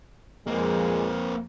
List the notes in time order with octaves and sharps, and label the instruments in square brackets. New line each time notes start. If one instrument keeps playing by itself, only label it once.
[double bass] F2 F3 [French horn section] A#2 G#3 [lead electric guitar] A#3 C4